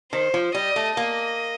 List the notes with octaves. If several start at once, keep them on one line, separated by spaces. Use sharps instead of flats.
D#3 C5
F3
G3 D#5
A3
A#3 D#5